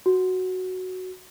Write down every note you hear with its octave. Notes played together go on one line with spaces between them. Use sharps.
F#4